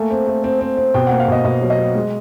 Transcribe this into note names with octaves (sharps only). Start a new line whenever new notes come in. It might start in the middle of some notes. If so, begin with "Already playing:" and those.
Already playing: A3 A#3 G#5
C4
A3
C4
C4
C4
B2 G5
A#3 F#5
F5
B2 D#5
B2 D#5
F#3
D#5
F#3
G#3